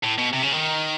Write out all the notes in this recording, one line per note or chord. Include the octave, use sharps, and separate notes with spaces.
A2
B2
C3
C#3
D#3